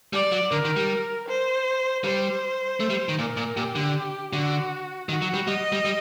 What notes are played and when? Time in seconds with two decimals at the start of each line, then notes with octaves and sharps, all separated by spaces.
0.13 G3 D5
0.32 F#3
0.52 D3 A#4
0.65 D#3
0.77 G3
1.28 C5
2.04 G3 C5
2.80 A3
2.90 G3
3.09 D#3
3.19 A#2 A#4
3.37 A#2
3.56 A#2 G4
3.75 D3
4.33 D3 F#4
5.09 D#3 F#4
5.22 F#3
5.34 G3
5.47 G3 D#5
5.72 G3
5.85 G3